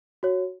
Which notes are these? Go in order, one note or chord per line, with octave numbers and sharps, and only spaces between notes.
F#4 C#5